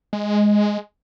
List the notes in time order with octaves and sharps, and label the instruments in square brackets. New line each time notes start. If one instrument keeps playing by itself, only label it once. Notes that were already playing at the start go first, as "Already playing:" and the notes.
[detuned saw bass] G#3